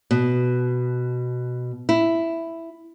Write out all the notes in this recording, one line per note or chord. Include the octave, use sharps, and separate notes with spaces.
B2
E4